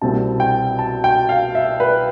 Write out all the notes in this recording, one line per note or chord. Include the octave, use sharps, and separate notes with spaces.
C2 B2 G3 C4 A5
G5
A5
G5
F5
E5
B4